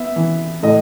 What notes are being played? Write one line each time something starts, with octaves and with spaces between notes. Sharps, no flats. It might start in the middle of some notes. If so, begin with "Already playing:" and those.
Already playing: B3 E5
E3
A2 D#5